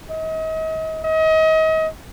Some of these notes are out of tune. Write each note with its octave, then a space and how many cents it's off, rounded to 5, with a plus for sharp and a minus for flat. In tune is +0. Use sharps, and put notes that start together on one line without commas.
D#5 +40
D#5 +35